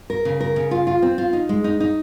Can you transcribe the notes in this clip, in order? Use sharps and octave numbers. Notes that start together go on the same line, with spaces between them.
A#4
C#3
A#4
C#3
F4
F4
C4
F4
D#4
G#3
D#4
D#4